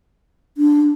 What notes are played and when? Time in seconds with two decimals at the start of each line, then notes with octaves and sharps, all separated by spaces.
0.57 D4